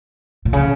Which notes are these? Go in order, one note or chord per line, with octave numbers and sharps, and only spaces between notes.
A#2
C#3